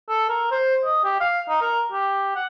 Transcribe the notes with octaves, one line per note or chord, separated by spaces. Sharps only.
A4
A#4
C5
D#5
G4
F5
D#4
A#4
G4
F#5